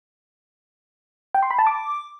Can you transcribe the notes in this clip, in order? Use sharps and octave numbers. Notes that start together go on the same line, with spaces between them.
G5
C6
B5
A5
D6